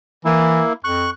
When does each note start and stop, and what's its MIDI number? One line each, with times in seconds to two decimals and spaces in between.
0.25 0.62 52
0.25 0.73 58
0.25 0.73 64
0.84 1.08 41
0.84 1.10 85
0.84 1.10 90